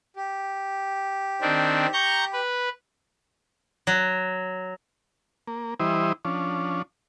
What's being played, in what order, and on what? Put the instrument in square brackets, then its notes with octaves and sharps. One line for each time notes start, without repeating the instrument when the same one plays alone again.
[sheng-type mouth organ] G4
[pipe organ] D#3 C4 D4
A#5 C#6 G6
B4
[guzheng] F#3
[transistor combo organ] A#3
E3 G3 E4 C5 D#5
F3 C#4 D4